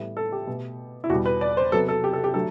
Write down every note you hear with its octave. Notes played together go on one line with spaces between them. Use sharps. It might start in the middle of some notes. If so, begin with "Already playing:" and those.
Already playing: A2 E3 G3 B3
A4
G4
B2 A3
E4
E2 B2 G3 F#4
B4
D5
C5
C3 F#3 B3 A4
A4
G4
A4
G4
D3 F#3 A3 A4